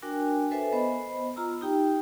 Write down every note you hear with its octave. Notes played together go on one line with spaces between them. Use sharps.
D4 F#4 A#4 G5 G#5
A4 B4 C5 E5 G#5
B3 C5 D#5 B5
F4 A#5 E6
D#4 G4 G5